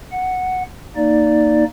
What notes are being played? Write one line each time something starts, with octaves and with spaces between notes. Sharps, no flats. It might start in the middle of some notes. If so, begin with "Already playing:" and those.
F#5
A#3 D#4 D5